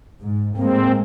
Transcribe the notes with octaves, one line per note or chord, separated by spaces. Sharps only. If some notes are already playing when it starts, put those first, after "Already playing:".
G#2
A2 G#3 A#3 C4